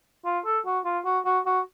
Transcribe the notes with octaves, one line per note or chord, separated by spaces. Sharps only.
F4
A4
F#4
F4
F#4
F#4
F#4